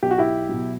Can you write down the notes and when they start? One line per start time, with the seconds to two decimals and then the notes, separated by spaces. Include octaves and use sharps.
0.03 B1 G4
0.11 F#4
0.18 E4 G4
0.49 B2 F#3